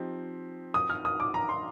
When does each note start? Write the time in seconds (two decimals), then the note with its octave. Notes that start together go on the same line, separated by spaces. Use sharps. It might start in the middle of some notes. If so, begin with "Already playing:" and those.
Already playing: F3 C4 D#4 G4
0.74 D#6
0.90 F6
1.05 D#6
1.20 D6
1.34 A#5
1.49 C6